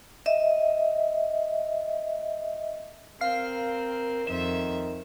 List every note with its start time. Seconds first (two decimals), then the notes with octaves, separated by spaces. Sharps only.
0.26 D#5 E5
3.21 C4 A#4 F5 F6 C7
4.27 F2 D#3 E5 E7